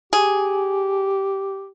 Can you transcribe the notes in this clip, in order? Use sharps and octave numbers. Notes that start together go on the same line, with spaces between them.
G4 G#4